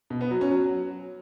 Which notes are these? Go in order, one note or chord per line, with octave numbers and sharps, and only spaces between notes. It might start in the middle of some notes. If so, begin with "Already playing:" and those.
B2
B3
F#3
C#4
F#3